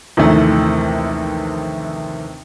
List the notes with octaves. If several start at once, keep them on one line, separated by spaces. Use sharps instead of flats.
A#1 D#2 C3 D#3 E3 A3